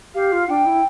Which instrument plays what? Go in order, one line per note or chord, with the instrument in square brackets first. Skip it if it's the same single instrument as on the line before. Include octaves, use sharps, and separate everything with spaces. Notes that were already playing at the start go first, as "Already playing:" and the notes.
[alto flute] G4 [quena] F5
[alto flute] F4
[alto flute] D4 [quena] G5
[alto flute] E4